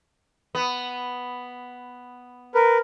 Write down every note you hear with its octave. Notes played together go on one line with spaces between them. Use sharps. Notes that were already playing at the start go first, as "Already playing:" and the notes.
B3
A#4 B4